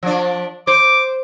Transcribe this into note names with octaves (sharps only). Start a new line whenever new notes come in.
F3 D4
C5 D6